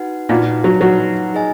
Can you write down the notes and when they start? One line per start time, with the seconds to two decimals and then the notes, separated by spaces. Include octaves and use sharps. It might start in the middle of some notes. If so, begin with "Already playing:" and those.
Already playing: D#4 F#4 B4 F#5
0.29 A#2 D#4 F#4 B4 F#5
0.64 F#3
0.81 F#3 D#4 F#4 B4 F#5
1.32 D#4 G#4 D#5 G#5